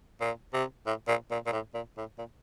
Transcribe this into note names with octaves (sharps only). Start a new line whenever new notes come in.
A#2
C3
A2
A#2
A#2
A#2
A2
A#2
A2
A#2